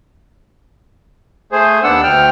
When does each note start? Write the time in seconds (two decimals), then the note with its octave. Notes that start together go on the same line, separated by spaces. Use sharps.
1.52 A3 G#4 C5
1.83 D#2 B3 D4 F#5 E6
2.03 D2 G5 F6